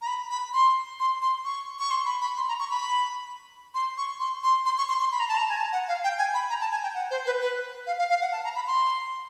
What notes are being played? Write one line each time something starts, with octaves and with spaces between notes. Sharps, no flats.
A#5
B5
B5
C6
C6
C6
C#6
C#6
C6
B5
B5
C6
A#5
C#6
B5
C6
C#6
C6
C6
C6
C#6
C6
C6
B5
A#5
A5
A#5
G#5
A5
F#5
F5
G5
G#5
B5
A#5
A5
G#5
G5
F#5
C5
B4
B4
F5
F5
F5
F#5
A5
A#5
B5
C6